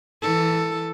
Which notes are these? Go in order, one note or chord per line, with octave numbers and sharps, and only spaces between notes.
E3 A4